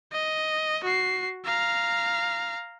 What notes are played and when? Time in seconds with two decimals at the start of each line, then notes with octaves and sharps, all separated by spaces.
0.12 D#5
0.84 F#4 C7
1.45 F5 A#5